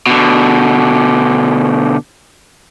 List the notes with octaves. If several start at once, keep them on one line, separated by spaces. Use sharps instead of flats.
B2 D3